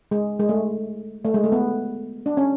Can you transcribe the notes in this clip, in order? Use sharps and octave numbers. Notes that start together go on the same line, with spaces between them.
G#3
G#3
A3
A3
G#3
A3
B3
D4
C#4